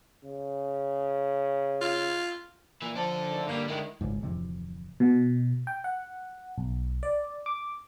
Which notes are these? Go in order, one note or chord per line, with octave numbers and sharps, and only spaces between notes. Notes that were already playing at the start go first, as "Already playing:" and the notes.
C#3
F4
A#2 E3
F3 D4 A4
D3 D#3 A3
G2 D3 G3 A#3
D#3 G#3 E4
G#1 C#2 G#2
D1 F2 C3 E3
B2
G5
F#5
B1
D5
D6